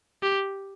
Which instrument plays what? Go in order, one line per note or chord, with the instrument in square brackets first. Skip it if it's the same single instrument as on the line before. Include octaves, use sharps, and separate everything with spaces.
[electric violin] G4